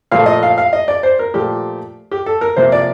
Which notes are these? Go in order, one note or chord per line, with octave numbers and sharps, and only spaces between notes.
A#2 F3 A3 F5
D#5
F5
F5
D#5
D5
C5
A#4
A#2 F3 A3 G4
G4
A4
A#4
C3 F3 A#3 C5
D5